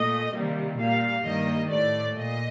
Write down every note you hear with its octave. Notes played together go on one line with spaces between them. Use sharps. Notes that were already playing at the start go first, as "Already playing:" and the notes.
Already playing: A#2 A3 D#5
C3 D#3 G3 A#3
A#2 G3 A#3 F5
G2 D#3 G3 A#3 D#5
A2 A3 D5
A#2 D#5